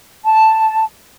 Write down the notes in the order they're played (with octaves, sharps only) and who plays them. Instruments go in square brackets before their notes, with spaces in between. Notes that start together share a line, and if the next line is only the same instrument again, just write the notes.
[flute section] A5